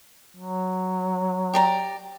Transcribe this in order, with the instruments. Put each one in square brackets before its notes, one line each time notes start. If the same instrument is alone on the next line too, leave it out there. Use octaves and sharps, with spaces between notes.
[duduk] F#3
[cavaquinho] G4 D5 A#5